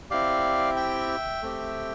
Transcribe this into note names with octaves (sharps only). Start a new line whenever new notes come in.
C4 E4 G4 D5 F5
E5 G5
A3 C4 G4